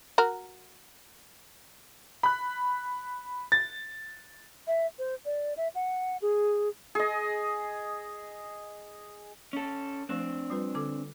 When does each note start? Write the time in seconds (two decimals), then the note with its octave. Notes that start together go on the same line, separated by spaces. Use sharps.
0.18 F#4 A#4
2.23 B5 F#6
3.52 A6
4.67 E5
4.99 C5
5.25 D5
5.57 E5
5.75 F#5
6.22 G#4
6.95 G#4 D#5
9.53 C#4 A4
10.09 F3 A3 C4 D4
10.50 G3 F4 B4
10.75 D3 A4 D6